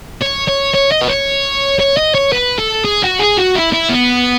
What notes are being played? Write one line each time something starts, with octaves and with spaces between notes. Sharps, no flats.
C#5
C#5
C#5
D#5
B4
C#5
C#5
D#5
C#5
B4
A4
G#4
F#4
G#4
F#4
E4
E4
B3